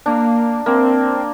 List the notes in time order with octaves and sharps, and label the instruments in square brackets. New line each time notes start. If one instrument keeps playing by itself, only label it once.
[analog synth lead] A#3 [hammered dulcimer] D4
[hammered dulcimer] A#3 [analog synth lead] C4